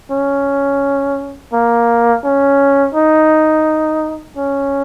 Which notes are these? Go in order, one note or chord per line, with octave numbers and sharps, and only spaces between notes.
C#4
A#3
C#4
D#4
C#4